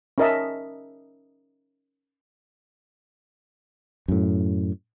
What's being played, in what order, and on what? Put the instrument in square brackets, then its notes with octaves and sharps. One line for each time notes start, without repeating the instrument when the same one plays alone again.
[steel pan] C#4 D#4 A#4 D#5 E5 A5
[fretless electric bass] F#2 A2